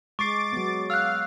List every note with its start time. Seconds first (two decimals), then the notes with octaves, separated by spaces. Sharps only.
0.19 G#3 C#6 D6 A6 C7
0.52 F#3 B3
0.90 F5 E6 F#6